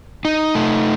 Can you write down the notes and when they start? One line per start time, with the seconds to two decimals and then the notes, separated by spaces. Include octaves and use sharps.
0.25 D#4
0.55 A3